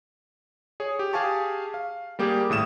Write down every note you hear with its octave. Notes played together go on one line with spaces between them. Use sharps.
G#4 C#5
G4
G4 G#4 F5 G#5 A5 C#6
F5
G3 A#3 G4 G#4
G#1 A2 D#6 E7